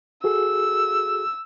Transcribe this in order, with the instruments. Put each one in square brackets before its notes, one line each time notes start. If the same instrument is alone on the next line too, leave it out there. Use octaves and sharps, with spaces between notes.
[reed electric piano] F#4 G#4 A4 [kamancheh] E6